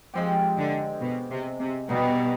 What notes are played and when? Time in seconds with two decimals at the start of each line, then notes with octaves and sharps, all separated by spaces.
0.14 F3 G#3 C4 G4
0.57 D3
1.01 B2
1.30 C3
1.59 C3
1.89 B2 G3 B3 D#4